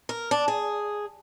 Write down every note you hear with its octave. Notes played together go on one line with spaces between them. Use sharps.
A#4
D4
G#4